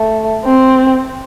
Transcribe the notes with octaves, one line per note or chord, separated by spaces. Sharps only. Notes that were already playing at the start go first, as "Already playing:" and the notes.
Already playing: A3
C4